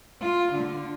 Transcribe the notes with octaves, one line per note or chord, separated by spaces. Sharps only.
F4
D3